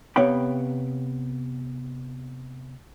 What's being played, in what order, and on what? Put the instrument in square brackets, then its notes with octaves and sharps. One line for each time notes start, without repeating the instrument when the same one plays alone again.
[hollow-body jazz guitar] C3 B3 C#5 F5 G5 B5